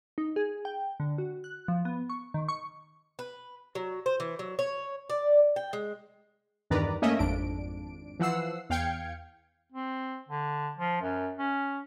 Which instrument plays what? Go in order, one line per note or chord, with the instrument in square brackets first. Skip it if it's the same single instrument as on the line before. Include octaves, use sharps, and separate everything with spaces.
[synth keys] D#4
G#4
G5
D3
F#4
F#6
F3
B3
C#6
D#3
C#6
[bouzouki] B4
F#3
C5
E3
F#3
C#5
D5
G5
G#3
[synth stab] E2 G2 D#3 B4 D5 A#5
A3 A#3 C#4 A#4 D#5 E5
G#1 F2 D4 D7
E3 F3 F#5 E6 C7
E2 F5 G5 G#6 C#7
[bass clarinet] C4
D3
F3
F#2
C#4